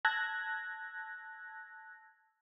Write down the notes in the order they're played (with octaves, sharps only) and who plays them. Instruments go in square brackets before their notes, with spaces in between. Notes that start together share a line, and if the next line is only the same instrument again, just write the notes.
[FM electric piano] A5 E6 F#6 G#6 A#6